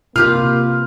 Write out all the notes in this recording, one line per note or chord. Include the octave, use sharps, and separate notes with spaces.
C3 A#3 F4 G4 B4 F6